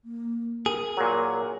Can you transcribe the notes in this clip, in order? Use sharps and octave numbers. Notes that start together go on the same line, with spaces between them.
A#3
G#4 A#4
A#2 F#3